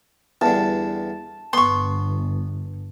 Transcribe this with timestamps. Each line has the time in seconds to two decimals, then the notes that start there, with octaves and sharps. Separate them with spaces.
0.41 E2 G2 D3 A5
1.53 G1 B3 C6 C#6